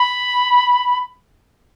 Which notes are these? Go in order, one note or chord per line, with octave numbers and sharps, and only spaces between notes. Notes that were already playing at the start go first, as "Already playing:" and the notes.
Already playing: B5